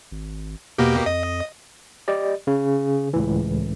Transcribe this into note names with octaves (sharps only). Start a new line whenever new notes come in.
G#1
E2 B2 A#3 G4
F2 D#5
G4 D5 D#5
C#3
C#2 A2 E3